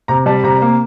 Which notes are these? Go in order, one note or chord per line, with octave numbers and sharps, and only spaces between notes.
C3 A#5
G3 A5
C3 A#5
A#3